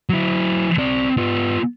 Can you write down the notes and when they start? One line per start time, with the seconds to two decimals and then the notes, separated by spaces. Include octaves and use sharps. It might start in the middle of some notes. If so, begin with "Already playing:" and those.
0.09 F#3 E4
0.79 C4 D5
1.17 B3 F4